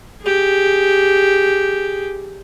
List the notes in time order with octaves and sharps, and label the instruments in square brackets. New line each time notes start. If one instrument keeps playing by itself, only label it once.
[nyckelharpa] G4 G#4